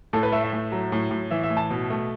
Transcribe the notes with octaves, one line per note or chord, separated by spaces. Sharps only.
A2 A4
B4
A3 E5
E5
A2
F#3
A2
A2
E3 E5
E5
A2
A5
B2
A3